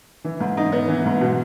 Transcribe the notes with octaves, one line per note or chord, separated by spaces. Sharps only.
E3
G#2
D#4
B3
E3
G#2
B2